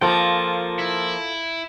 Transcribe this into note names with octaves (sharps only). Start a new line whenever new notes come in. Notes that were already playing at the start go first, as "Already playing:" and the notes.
F3 A#3 F4 A4 G5
E4